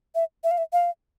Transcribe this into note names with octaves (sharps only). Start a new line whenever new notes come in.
E5
E5
F5
E5
F5